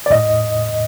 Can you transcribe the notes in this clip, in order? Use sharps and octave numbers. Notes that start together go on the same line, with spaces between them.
D5
A2 D#5